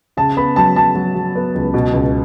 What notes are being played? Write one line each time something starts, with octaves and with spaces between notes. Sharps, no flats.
C#3 A5
B3 B5
F#3 A5
F#3 A5
F#3
F#3
B3
C#2
B2
C#2